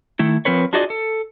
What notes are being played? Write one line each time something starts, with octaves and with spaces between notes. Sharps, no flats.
D#3 A3 E4
F3 C4 A#4 B4 C#5
D4 F4 F#4 G#4 D5 D#5
A4